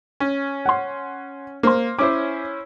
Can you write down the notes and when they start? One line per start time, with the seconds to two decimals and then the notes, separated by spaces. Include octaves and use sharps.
0.20 C#4
0.66 F#5 C6
1.63 A#3 C5 C6
1.99 C#4 E4 C5 C#5 D6